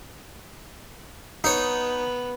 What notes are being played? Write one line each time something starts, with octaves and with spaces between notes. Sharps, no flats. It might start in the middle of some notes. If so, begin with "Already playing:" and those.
B3 D#4 C#5